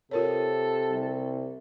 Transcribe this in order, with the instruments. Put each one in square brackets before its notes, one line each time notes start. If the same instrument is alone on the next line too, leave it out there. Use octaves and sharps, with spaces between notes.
[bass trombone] C3 [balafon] F4 A#4 C#5 [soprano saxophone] A4
[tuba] C2